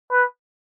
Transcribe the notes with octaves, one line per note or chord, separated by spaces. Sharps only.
B4